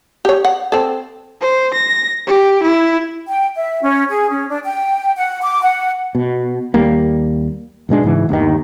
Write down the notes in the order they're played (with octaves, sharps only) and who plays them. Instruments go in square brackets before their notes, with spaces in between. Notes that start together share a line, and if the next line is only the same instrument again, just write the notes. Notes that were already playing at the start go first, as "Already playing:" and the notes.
[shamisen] G4 C#5
F#5
C4 A4
[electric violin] C5
A#6
G4
E4
[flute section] G5
E5
C#4
G#4
C#4
D4
G5
F#5
D6
F#5
[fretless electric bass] B2
D#2 G3 A#3
G1 B2 G#3 D4
G#2 C#3 E3
G1 D#2 B2 D#3